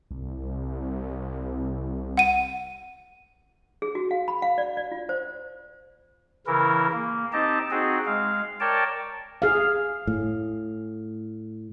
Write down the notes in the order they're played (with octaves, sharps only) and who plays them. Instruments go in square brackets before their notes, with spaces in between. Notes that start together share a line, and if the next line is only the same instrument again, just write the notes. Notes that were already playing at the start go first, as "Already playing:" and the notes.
[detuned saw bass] C2
[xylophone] F#5 D#7
[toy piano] G#4
F#4
F5
B5
F5
D5
D5
F4
C5
[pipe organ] C#3 E3 E4 A#4
A#3
C4 D#4 G4 D#5 A5
C4 D#4 F#4 G#4
G#3 F5
A#4 C#5 D5 G5 A5
[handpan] G#4 F5
[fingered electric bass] A2